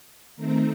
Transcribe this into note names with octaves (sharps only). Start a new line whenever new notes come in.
D#3 A3 C4 A#5